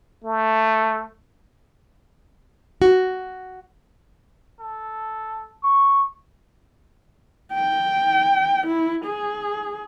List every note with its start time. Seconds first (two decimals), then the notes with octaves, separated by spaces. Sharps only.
0.24 A3
2.82 F#4
4.60 A4
5.63 C#6
7.54 G5
8.67 E4
9.06 G#4